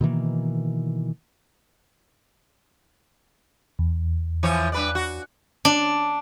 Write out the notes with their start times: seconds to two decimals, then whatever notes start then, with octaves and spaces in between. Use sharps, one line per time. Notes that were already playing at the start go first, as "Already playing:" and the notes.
0.01 B2 D#3 E3 A#3
3.79 E2
4.43 E3 F3 C#5
4.72 G2 B4 D5
4.95 F#4
5.65 D4